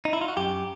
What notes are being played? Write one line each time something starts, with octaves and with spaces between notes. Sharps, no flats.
D#4
E4
F4
F#4
F#2 G4